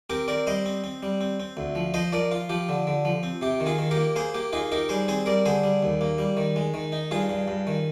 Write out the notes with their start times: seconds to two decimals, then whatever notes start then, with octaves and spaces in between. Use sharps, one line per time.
0.10 C4 G4 A#4
0.28 C4 A#4 D5
0.47 G3 C5 D#5
0.66 C4
0.84 C4
1.03 G3
1.21 C4
1.40 C4
1.57 D2
1.75 F3
1.94 F3 C5 D#5
2.12 F3 A#4 D5
2.31 F4
2.49 F3 G4
2.69 D3
2.87 D3
3.05 F3
3.23 C4
3.41 C3 G4
3.60 D#3
3.66 F4 G#4
3.78 D#3
3.91 G4 A#4
3.97 A#3
4.16 A#3 G#4 C5
4.34 A#3 G4
4.53 D#4 F4 G#4
4.72 D#4 G4 A#4
4.89 G3 G#4 C5
5.08 C4 G#4 C5
5.26 G3 A#4 D5
5.46 D3 G#4 C5
5.63 G3
5.83 D#2
6.01 A#3
6.18 G3
6.37 D#3
6.56 G#3
6.74 D#3
6.92 D#4
7.11 G2 F4 G#4
7.29 G2
7.48 G2
7.67 D#3